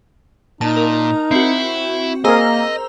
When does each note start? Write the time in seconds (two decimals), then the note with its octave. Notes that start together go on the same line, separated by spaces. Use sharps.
0.61 A#2 D#4 A5
0.76 A#4
1.31 C4 E4 F#4
2.25 A#3 G#4 A#4 C5 D#5 A#5 E6